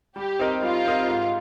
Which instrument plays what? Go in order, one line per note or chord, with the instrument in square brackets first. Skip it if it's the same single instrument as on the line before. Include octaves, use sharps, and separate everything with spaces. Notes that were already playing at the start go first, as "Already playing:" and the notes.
[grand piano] G3 [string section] G4
[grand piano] C4 D#4 A#4 D#5
[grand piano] G3 [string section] F4
[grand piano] C4 D#4 A#4 D#5
G#2